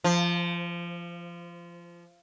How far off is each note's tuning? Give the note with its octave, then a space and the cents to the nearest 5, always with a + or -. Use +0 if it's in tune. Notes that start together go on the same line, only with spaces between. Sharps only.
F3 -20